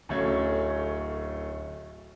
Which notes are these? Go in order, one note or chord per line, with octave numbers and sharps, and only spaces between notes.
D1 A3 C#4 G#6